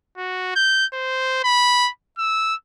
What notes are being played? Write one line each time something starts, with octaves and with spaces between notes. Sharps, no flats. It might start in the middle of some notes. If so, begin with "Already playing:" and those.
F#4
G6
C5
B5
E6